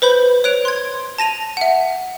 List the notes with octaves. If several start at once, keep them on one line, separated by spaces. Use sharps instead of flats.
B4 C5 B5 G6
C#5 F#6 D7 F7
C6 G#6
A5 A#6 D#7 F7
E5 F#5